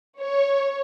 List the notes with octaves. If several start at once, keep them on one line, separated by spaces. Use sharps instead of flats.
C#5